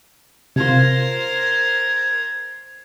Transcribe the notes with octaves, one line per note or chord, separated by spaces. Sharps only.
C3 F4 A#4 C5 G#6